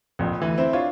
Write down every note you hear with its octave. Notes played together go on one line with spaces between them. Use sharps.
A#1 F2
D2 E3
C4 E4 C5
D4 F4 C#5